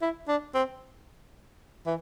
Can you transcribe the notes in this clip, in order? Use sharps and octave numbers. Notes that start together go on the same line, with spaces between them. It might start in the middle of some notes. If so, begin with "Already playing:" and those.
E4
D4
C4
E3